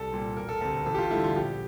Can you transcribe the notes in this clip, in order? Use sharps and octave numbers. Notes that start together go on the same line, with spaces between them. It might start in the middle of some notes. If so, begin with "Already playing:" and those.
Already playing: C2 A4
A#2 G3 C4
E1 A#4
A4
D2 C3 A4
A1 A4
G4
F4
G2 D3 A3 E4
F4
A#1 G4